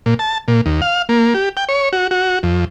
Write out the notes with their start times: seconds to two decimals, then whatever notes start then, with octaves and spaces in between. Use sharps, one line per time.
0.06 A#2
0.19 A5
0.48 A#2
0.66 D#2
0.82 F5
1.09 A#3
1.34 G4
1.57 G5
1.69 C#5
1.93 F#4
2.11 F#4
2.43 F2